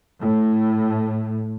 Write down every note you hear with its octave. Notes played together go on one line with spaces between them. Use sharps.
A2